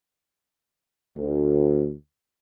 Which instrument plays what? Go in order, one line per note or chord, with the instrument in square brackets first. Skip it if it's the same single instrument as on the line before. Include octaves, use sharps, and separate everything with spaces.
[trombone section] D2